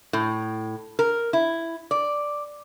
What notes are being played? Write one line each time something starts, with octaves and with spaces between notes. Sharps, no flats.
A2
A#4
E4
D5